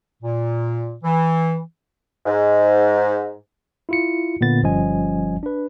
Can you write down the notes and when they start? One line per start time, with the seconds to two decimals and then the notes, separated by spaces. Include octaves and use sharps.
0.22 A#2
1.03 E3
2.25 G#2
3.89 E4 F4 C#7
4.41 A#2 D3 B3 A6
4.63 G1 F3 G3 C#4 D#5 G#5
5.43 D4 B4